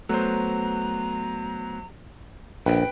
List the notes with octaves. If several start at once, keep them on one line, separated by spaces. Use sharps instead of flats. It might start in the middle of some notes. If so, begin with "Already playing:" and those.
F#3 A3 B3 C5 A#5
A#1 B4 G5